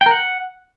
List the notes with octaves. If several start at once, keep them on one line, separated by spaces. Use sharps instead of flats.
G5
A#4
F#5